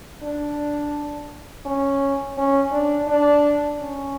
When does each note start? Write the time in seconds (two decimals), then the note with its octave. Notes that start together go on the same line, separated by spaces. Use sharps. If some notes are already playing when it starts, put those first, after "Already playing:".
0.23 D4
1.66 C#4
2.37 C#4
2.72 D4
3.08 D4
3.79 C#4